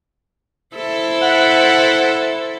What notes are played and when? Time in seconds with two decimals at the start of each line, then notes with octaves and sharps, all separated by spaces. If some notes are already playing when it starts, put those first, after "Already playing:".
0.76 E4 A4 C5
1.23 F#5